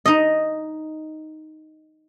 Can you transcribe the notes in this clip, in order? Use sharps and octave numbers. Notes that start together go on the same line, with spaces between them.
D#4 D#5